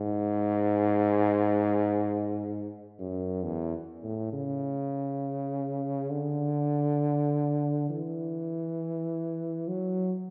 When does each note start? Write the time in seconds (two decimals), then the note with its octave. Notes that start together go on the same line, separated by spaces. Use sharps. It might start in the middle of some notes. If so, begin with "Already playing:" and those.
Already playing: G#2
2.99 F#2
3.43 E2
4.03 A2
4.33 C#3
6.11 D3
7.90 E3
9.68 F#3